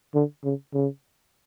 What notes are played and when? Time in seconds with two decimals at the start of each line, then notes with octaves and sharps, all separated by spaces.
0.14 D3
0.44 C#3
0.74 C#3